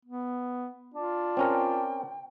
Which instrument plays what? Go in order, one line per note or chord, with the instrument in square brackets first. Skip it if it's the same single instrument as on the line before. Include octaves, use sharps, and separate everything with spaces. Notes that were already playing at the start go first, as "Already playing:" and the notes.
[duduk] B3
[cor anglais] D4 [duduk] F4
[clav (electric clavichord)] C4 C#4 A#4 [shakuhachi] G5